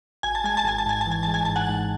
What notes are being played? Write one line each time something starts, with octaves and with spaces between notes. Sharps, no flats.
G#1 G#5
A5
G#3 G#5
A5
G#1 G#5
A5
G#2 G#5
E3 A5
G#5
G#3 A5
G#5
G#2 A5
F#5 G#5
G#2